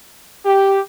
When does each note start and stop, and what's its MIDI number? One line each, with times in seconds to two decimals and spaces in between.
0.45 0.79 67